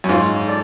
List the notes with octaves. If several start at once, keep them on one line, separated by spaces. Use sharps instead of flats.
F#2
G#2 F4
A4 D5